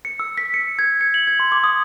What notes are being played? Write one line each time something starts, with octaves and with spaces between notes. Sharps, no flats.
C#7
E6
B6
C#7
G#6
C#7
F#7
G#6
C6
D6
D#6